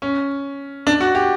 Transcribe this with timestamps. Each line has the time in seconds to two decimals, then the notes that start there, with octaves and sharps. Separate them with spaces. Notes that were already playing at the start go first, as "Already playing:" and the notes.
0.02 C#4
0.87 D4
1.01 F#4
1.15 G4